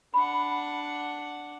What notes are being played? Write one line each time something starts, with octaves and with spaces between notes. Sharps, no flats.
D4 F#5 B5